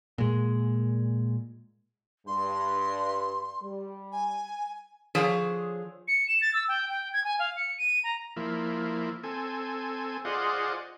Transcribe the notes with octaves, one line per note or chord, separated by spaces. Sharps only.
A#2 G#3
G2 C6
G3
G#5
D3 F3 G#4 C5 C#5
C#7
E7
A6
E6
G5
G5
G#6
G#5
F5
C#7
D#7
A#5
F3 A#3 E4
C4 A4 G#5
F4 G#4 C5 D5 D#5 F#5